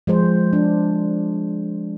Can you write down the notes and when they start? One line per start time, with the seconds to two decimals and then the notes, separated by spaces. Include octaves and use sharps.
0.07 F3 G#3 C5
0.53 D4